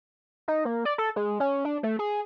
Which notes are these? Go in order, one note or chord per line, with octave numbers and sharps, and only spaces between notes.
D#4
A#3
D5
A4
G#3
C#4
D4
A3
G#4